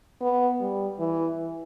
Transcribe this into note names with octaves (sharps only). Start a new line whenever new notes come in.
B3
G3
E3